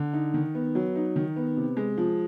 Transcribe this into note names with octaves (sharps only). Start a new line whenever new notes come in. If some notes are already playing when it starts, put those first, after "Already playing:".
Already playing: D3
D#4
D#3
B3
F#3
D#4
D#3
B3
C3
G#3
F3